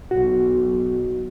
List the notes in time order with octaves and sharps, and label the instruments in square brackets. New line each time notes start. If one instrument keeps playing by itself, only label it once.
[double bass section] B1 [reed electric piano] F#4